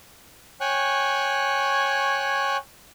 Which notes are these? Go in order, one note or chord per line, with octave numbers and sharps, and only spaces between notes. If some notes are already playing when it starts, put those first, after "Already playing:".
C#5 G5 G#5 C#6 F#6